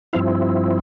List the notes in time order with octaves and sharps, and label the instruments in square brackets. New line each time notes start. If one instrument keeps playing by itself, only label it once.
[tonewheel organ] G2 F3 C4 E4 F5